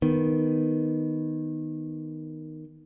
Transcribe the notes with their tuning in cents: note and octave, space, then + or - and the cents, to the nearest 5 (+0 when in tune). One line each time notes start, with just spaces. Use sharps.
D#3 +0 B3 +0